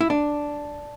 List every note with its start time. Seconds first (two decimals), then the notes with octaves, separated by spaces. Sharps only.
0.01 E4
0.10 D4